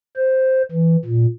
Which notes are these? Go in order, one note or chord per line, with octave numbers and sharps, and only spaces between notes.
C5
E3
A#2